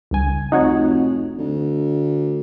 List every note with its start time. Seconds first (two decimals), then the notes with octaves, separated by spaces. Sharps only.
0.11 C#2 G2 G#5
0.52 F1 D#4 F#4 C#5
1.38 D2